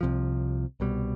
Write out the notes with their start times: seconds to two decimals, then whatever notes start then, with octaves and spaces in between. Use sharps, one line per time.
0.01 C2 C3 F3
0.80 C2 B2 G3